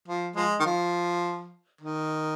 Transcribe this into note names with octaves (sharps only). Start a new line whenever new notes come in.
F3
F3 G#3
D#3
F3
D#3